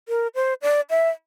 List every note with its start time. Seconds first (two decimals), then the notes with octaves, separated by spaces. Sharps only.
0.09 A#4
0.35 C5
0.62 D5
0.90 E5